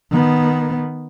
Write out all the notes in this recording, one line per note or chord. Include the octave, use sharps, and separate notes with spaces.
D#3 B3